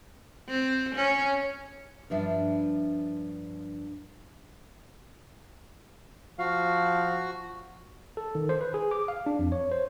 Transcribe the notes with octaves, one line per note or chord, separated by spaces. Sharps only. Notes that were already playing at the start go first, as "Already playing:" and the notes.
C4
C#4
G2 F3 D4 E5
F3 F#4 F5
A4
D#3
C5
B4
G#4
D6
F5
D4
F2
C#5
C5